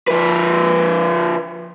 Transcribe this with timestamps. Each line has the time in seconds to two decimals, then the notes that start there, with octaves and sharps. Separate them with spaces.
0.08 F3 B4